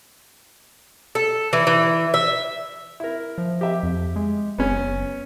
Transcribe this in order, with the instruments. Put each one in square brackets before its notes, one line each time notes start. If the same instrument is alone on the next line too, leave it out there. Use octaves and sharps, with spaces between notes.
[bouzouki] A4
E3
E3
E5
[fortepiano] E4 A#4
[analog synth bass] F3
[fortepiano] G4 E5
[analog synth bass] F2
G#3
[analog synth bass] F#1 [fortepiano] B3 C#4